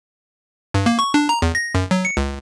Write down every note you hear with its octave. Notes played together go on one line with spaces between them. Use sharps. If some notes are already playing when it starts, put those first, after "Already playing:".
G2
A#3
C#6
D4
A#5
E2
A#6
F#2
F#3
C#7
C#2